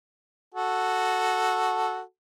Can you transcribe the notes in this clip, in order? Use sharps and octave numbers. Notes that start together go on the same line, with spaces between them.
F#4 A4